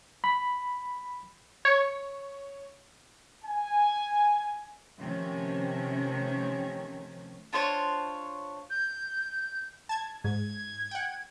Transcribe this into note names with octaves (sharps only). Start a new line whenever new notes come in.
B5
C#5
G#5
C3 D#3 F3 A3 C#4
D4 F4 C5 C#5
G6
A5 G#6
G#2 G#6
F#5 G5